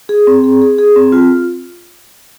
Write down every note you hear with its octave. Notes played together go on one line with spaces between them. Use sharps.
G#4
C4
G#4
G#4
G#4
C4
F4